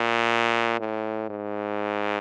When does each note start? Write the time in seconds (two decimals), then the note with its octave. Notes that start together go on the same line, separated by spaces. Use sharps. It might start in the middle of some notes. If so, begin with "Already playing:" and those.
Already playing: A#2
0.80 A2
1.30 G#2